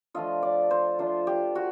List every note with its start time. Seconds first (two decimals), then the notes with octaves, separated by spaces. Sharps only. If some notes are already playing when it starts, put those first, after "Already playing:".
0.14 F3 A3 D4 F4 D#5
0.43 D5
0.71 C5
0.99 F3 A3 D4 F4 C5
1.27 G4
1.55 F#4